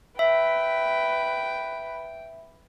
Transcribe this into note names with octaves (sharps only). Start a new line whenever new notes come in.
B4 E5 G5